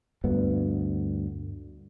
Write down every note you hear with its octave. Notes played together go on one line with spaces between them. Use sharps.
D2 G2 B3